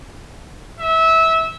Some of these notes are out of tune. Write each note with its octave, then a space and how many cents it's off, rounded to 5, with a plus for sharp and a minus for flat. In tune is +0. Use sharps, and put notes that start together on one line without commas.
E5 -20